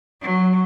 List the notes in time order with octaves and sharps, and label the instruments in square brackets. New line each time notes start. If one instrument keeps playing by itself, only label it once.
[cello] F#3